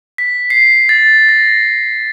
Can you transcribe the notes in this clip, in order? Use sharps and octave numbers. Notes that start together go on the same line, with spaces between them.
B6
C7
A6
A#6